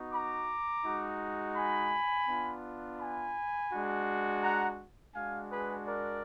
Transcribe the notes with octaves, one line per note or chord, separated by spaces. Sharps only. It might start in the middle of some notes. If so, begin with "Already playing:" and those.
Already playing: B3 D#4 F#4
A#5 D6
G#3 D#4 F#4
G#5 B5
B3 D4 F4
G#5 B5
G#3 D4 F#4
F#5 A#5
G#3 D4 F#4 F5 G#5
G#4 B4
A#4 D5